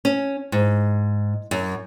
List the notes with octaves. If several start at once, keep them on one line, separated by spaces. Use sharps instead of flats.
C#4
G#2
F#2